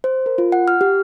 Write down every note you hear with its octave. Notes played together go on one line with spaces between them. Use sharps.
C5
A#4
F4
F#5
F6
G4